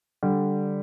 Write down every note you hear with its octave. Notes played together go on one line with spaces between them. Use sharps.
D3 G3